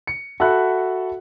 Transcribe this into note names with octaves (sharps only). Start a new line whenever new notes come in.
C#7
F#4 A4 E5 F#5 B5 F#6